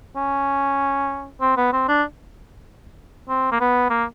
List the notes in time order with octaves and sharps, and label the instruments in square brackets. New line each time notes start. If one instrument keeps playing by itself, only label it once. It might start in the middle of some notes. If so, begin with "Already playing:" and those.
[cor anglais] C#4
C4
B3
C4
D4
C4
A#3
B3
A#3